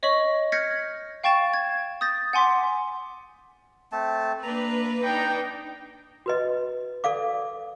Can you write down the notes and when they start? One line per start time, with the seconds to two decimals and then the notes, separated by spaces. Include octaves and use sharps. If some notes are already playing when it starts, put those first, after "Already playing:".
0.03 C#5 D#5 C#6 B6 F#7
0.52 F6 G6 G#6 A#6 B6 C#7
1.24 F5 G5 C#6 A6 E7
1.54 G#6
2.01 D#6 G6 A6 A#6
2.33 F#5 G#5 C6 D6 B6
3.92 A3 C4 A5
4.43 A#3 D4 B4 A#5
5.03 D4 D#4 G5
6.26 F#4 B4 D#5
7.04 A4 D5 F5 D6